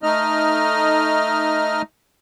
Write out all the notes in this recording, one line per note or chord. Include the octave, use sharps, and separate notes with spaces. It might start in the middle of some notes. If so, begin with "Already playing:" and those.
A3 D#4 D#5 F6